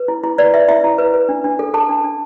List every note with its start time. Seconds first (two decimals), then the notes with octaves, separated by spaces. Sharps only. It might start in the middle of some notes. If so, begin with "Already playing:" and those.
Already playing: B4
0.08 E4
0.24 E4
0.38 B4 D5
0.54 B4 E5
0.68 E4 E5
0.84 E4
0.98 B4
1.14 B4
1.29 D4
1.44 D4
1.59 A4
1.74 A4 A5
1.89 D4
2.04 D4